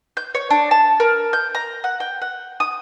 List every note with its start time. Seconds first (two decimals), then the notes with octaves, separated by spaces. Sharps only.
0.17 G6
0.35 C#5
0.50 D4
0.71 A5
1.00 A#4
1.33 G6
1.55 A#5
1.84 F#5
2.00 G5
2.22 F#5
2.60 D#6